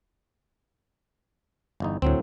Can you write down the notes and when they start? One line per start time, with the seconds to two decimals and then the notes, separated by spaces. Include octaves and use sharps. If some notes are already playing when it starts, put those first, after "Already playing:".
1.80 G1 E2 D#4
2.02 D2 A2 F#3 C4